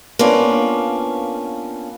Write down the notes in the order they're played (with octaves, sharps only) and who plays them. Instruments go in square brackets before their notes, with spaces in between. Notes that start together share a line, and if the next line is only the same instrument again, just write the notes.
[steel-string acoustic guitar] A#3 B3 C#4 D4 F4